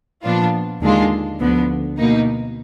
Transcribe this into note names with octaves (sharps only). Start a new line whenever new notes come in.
A#2 F3 B3 D4 F4
D#2 D3 G#3 D4 F4
D2 D3 F3 B3
B2 A#3 D#4